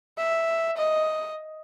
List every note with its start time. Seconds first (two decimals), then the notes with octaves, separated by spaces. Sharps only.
0.18 E5
0.77 D#5